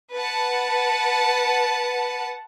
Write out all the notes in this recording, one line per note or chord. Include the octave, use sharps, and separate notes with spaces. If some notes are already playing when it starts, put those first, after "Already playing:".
B4 F#5 A5